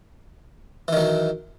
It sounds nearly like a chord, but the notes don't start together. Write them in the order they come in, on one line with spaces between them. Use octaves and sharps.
E3 D#3 F#3